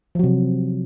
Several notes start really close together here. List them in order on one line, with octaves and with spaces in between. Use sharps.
F3 F#3 C3